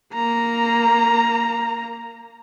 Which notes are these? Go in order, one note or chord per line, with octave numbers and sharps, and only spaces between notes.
A#3 A#5